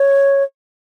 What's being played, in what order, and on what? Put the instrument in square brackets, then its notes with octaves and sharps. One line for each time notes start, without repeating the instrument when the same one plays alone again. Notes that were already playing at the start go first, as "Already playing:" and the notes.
Already playing: [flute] C#5